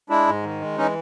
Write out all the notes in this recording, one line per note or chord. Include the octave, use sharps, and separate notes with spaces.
G#3 D4 E4
G#2
D#3
G#3
E3 C#4 D#4